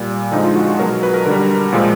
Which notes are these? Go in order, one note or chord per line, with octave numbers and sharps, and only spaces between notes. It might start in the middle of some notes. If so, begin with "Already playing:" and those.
Already playing: A#2 G3
D3 F3 G#3 D#4
F4
F#4
F#4
B2 F#3 A#4
B4
A#4
D3 G3 A#4
A#2 F3 G#3